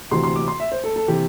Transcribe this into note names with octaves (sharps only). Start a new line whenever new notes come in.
D2 C3 E3 C6
C6
D6
C6
E5
C5
A4
A4
C3 E3 G4